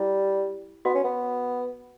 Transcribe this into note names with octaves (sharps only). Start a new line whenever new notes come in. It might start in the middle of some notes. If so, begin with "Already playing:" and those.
Already playing: G3 E4
B3 F#4
C#4
B3